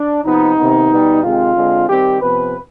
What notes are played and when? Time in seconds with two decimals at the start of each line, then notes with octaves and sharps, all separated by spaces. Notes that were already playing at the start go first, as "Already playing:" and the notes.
Already playing: D4
0.24 C3 F3 B3 D#4
0.57 C3 D#3 B3
0.90 B2 G3 B3
1.23 C3 D#3 G#3 C4 F4
1.55 D3 G#3 C4
1.88 D#3 G3 C4 G4
2.22 C3 F3 B3 B4